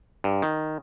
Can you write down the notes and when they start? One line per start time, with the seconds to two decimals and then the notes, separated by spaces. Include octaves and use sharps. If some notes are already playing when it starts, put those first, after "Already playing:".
0.24 G2
0.42 D#3